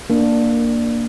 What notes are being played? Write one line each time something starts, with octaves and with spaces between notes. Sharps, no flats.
A#3 D4